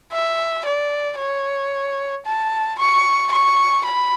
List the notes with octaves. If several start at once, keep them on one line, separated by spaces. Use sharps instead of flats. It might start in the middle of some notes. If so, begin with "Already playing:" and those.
E5
D5
C#5
A5
C#6
C#6
B5